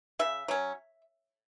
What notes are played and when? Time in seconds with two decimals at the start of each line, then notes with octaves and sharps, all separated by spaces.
0.19 C#3 E5
0.48 F#3 C#4